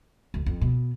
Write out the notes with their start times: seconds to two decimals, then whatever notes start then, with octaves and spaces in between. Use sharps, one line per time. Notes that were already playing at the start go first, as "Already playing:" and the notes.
0.34 D2
0.46 F2
0.61 B2